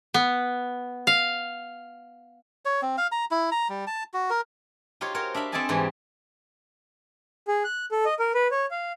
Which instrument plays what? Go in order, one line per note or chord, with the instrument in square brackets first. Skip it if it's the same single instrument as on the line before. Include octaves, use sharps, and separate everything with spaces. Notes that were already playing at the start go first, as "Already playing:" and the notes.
[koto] B3
F5
[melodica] C#5
C4
F5
A#5
E4
A#5
G3
A5
F#4
A#4
[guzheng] D#4 F4 G4 C5 C#5
F#4 A#4 C5 C#5 F5
D4 E5 F5 B5
C4 A4 D5 D#5 G#5 A5
G#2 E3 G3 G4
[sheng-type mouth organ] G#4
F#6
A4
D#5
A#4
B4
C#5
F5